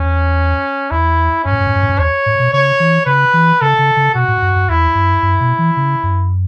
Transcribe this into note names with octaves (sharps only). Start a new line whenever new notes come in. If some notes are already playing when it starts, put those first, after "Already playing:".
Already playing: E2 C#4
E2 E4
F#2 C#4
A2
F#2
A2
F#2
A2
F#2
E2 C#5
A2
B2
C#3 C#5
E3
C#3 B4
E3
C#3 A4
C#3
C#3
B2 F#4
A2
F#2
F#2
E2 E4
F#2
F#2
B2
E3
C#3
F#2